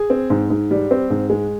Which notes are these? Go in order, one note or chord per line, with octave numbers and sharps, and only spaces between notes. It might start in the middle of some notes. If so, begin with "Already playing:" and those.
Already playing: G#4
C4
G#2
G#2
G3
C4
G#2
G#3